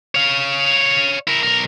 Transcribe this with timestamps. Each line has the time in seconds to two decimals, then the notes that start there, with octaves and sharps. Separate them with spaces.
0.15 C#5 F5
1.27 E4 A#4
1.43 B1 A#4